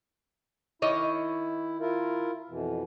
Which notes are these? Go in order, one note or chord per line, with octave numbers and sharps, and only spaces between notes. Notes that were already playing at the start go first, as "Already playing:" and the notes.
D#3 E4 C#5 D#5
E4 F4 A#4
F2 B2 E3